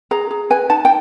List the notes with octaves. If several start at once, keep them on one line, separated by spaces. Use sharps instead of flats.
G#4 A#5
G#4
B4 G#5
D#4 A5
G5